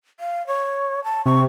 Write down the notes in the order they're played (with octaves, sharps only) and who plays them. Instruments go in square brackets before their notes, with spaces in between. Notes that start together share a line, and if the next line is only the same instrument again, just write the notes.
[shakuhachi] F5
C#5
A5
[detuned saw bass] C3 [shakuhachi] C#6